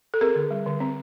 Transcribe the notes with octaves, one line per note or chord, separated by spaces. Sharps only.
A4
C4 G#4 A#4
D3
G3
D3
C4